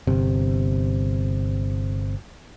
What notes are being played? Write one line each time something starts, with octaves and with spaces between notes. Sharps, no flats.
G1 C3